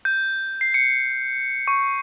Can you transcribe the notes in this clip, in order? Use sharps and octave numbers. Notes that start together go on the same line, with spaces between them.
G6
C7
C#7
C#6